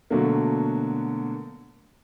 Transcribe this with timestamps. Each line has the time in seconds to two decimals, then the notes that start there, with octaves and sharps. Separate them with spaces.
0.10 B2 D3 F#3 A3 A#3